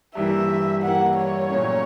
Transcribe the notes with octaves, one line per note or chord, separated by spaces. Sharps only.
G2 E3 G3 A#3 E5
G2 E3 G3 A#3 F#5
C#5
A#2 F#3 A3 C#4